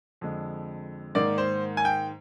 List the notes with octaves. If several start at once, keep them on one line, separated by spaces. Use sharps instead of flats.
F2 D3 G#3
G#2 D#3 A#3 D5
C5
G#5
G5